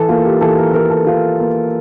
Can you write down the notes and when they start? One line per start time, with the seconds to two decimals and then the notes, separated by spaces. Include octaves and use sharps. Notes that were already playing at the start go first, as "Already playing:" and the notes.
Already playing: E3 A4
0.09 A#3 F4
0.25 G4
0.41 E3 A4
0.58 A#4
0.74 A#3 A#4
0.90 A4
1.06 E3 F4
1.39 A#3